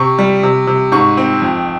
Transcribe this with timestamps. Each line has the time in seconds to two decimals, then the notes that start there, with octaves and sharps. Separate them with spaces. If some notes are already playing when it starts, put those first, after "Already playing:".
Already playing: C3 C#6
0.19 G3
0.43 C3
0.67 C3
0.92 G#2 C#6
1.17 C4
1.41 F2